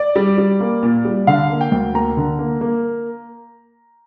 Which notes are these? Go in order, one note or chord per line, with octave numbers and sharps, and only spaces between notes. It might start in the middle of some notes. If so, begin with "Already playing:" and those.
Already playing: D5
G3
G3
A#3
A#2
G3
D3 F5
A#3
G5
D2
A#3 A#5
D3
A#3
A#3